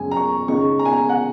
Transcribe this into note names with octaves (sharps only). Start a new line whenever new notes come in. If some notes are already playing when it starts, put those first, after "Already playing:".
Already playing: F#2 C#3 G#3 G#5
A#5
C#6
C#2 C#3 G#3 D#4 C#6
A#5
G#5
A#5
F#5